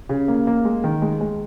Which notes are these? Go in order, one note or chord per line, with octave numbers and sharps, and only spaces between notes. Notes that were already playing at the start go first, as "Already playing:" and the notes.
C#3
A#3
A#3
G#3
D#3
G#3
G#3